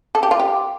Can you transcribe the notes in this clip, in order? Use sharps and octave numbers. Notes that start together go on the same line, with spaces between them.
A4
G4
F4
G4